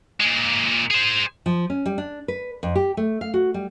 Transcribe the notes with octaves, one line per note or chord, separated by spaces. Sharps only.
A#2 G#3
G#4 C5
F3
C#4
G3
D4
B4
F2
G4
A3
F5
F#4
G3